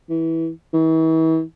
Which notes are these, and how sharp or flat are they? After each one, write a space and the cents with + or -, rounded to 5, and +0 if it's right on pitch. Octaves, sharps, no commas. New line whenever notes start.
E3 -15
E3 -40